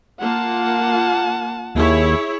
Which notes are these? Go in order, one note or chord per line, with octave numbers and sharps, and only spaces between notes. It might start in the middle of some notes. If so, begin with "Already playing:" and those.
A#3 F4 F#5 A5
D#2 E4 G#4 C#5